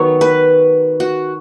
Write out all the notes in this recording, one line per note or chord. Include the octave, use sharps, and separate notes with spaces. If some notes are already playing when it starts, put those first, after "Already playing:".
Already playing: D#3 F#3 B3 C#5
B4
F#4